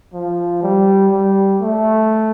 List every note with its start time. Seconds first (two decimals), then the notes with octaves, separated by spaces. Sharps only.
0.13 F3
0.63 G3
1.12 G3
1.61 A3